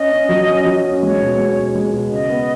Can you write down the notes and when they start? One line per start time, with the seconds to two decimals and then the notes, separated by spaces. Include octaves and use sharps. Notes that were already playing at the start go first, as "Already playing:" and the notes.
Already playing: C#4 D#5
0.12 C#4
0.29 F#3
0.47 C#4
0.65 F#3
0.85 C#4
1.03 G#3 C#5
1.20 B2
1.38 G#3
1.57 B2
1.75 G#3
1.93 B2
2.11 C#3 D#5
2.29 B3